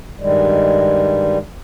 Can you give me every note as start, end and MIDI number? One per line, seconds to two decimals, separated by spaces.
0.19 1.38 43
0.19 1.38 51
0.19 1.38 55
0.19 1.38 56